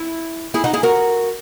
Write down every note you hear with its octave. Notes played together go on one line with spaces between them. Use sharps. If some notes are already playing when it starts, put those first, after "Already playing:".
Already playing: E4
E4 G#4
D#4 F#4
E4 G#4
F#4 A#4